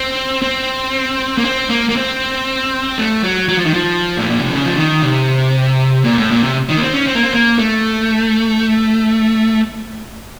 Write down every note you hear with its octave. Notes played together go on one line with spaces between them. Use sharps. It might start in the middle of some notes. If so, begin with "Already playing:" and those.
Already playing: C4
C4
A#3
C4
A#3
A#3
C4
A3
F#3
F#3
F3
D#3
F3
A2
A#2
C3
C#3
F3
D#3
C3
A#2
A2
A#2
C3
D#3
A#3
C4
C#4
C4
A#3
C4
A#3
A3